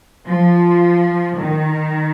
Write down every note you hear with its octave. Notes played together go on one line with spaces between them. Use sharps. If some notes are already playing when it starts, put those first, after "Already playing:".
F3
D#3